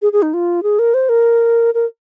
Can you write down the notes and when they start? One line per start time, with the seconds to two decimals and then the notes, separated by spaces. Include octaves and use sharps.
0.02 G#4
0.13 G#4
0.22 D#4
0.34 F4
0.63 G#4
0.79 A#4
0.94 C5
1.09 A#4
1.74 A#4